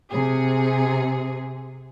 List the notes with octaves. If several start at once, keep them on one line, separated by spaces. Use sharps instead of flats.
C3 G#4